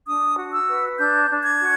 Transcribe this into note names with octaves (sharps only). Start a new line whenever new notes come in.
D4 D#6
F#4
E6
B4
D4 G6
D4
G#6
F#4